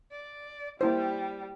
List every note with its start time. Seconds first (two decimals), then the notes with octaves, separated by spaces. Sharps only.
0.12 D5
0.81 G3 A#3 E4 C5